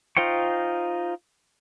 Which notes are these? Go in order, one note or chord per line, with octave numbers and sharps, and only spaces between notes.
D#4 F4 C5 G5 C#6